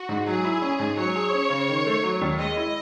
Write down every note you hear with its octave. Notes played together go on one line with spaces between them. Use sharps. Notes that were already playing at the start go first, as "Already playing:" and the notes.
Already playing: F#4
G#2
F#3 G#4
E4
C#4
G#2
F#3 C#5
G#4
C#4
C#3
D#3
A3
F#3
D#2
G#3 D#5
E4